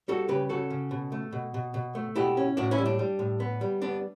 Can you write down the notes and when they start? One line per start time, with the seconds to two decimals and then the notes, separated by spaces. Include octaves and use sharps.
0.08 G3 F#4 A4
0.28 C#3 G4 B4
0.49 C#3 F#4 A4
0.70 C#3
0.91 B2
1.12 A3
1.32 B2
1.54 B2
1.74 B2
1.95 A3
2.16 B2 E4 G4
2.37 C#4
2.57 A2 D4 F#4
2.71 C#4 E4
2.78 G3
2.86 D4
2.99 G3
3.19 A2
3.40 B3
3.61 G3
3.82 B3 D4